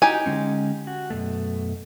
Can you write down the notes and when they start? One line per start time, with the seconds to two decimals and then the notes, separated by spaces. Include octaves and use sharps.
0.02 D#4 E4 F#4 G4 G#5
0.26 D3 G#3 C#4
0.87 F#4
1.10 F#2 B2 A3